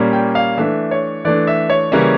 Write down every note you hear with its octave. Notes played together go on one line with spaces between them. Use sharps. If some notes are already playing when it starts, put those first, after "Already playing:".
Already playing: A#2 G3 A#3 C#4
G5
F5
E3 A3 D4 E5
C#5
E3 A3 D4 D5
E5
C#5
C#3 E3 G3 A#3 C#4